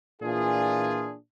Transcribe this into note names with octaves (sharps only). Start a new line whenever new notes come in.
A#2 E3 D4 F4 G#4